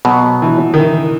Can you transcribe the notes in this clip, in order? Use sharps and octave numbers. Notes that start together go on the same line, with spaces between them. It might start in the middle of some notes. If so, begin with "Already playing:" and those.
B2 F#3 B3
E3
D#3
E3